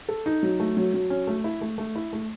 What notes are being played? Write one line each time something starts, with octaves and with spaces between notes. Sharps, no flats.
A4
D#4
F#3
A3
F#3
F#3
C#4
A3
E4
A3
A3
E4
A3